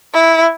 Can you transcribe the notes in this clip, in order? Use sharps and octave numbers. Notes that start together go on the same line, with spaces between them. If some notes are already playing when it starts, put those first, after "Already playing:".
E4